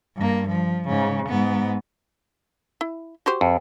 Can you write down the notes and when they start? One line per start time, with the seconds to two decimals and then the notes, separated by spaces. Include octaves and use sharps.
0.17 G2 A#3
0.48 F3
0.88 G#2 C#3
1.29 G#2 B3
2.81 E4
3.26 F#4 G4 C5
3.41 F2